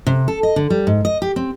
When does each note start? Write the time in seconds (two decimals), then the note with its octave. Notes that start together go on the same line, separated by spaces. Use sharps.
0.07 C3
0.28 A4
0.43 D#5
0.56 D3
0.70 G3
0.87 G#2
1.05 D#5
1.22 G4
1.36 C4